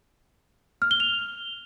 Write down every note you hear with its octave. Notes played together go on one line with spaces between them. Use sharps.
F6
G7
F7